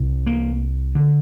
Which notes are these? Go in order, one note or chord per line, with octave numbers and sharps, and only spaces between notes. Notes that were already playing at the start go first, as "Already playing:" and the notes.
Already playing: C2 C3
A#3
D3